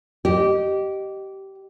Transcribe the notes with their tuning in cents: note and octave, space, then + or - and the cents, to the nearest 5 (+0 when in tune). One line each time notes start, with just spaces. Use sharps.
G4 -20 D#5 -15